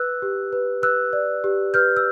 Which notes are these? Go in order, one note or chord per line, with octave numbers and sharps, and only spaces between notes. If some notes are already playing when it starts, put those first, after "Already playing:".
Already playing: B4 E6 F#6
G4
B4
B4 E6 F#6
D5
G4
B4 F6 G6
E6